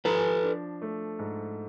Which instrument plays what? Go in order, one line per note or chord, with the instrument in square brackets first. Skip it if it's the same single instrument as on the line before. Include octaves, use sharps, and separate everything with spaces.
[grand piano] F3 [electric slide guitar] A4 B4
[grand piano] D4
A3
G#2